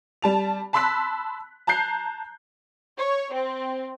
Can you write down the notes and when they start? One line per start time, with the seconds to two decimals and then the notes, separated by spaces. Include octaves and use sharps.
0.22 G3 A5 F7
0.73 A5 B5 C6 E6 F#6 B6
1.67 A5 A#5 F#6 G6 C7
2.98 C#5
3.32 C4